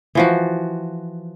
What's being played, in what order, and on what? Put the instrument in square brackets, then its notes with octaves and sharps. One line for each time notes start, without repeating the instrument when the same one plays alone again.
[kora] E3 F3 F#4